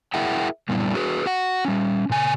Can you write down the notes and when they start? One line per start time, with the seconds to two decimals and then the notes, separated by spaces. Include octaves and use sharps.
0.14 E4 G#4 A#4 E5 F#5 G5
0.69 F#2 A#2 G3 B3 D4 E4
0.95 F#4 G#4 B4
1.26 F#4 F#5
1.65 G3 C#4
2.10 A#2 C#3 G#5